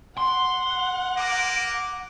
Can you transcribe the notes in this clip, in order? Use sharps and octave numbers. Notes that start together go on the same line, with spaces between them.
F#5 C6
A#3 D6